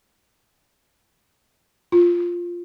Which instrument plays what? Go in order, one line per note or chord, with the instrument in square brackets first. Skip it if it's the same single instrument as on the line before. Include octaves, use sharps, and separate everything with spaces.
[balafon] F4